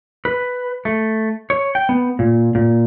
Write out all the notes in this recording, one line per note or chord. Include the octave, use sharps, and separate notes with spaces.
B4
A3
C#5
G5
B3
A#2
A#2